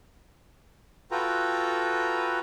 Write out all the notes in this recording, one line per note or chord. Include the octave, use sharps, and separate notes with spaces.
F4 F#4 A4 B4 G5 A#5